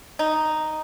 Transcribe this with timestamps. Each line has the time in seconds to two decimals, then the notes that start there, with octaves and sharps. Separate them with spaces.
0.19 D#4